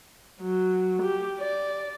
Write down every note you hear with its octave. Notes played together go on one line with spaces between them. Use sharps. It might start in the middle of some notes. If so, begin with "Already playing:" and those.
F#3
G4
D5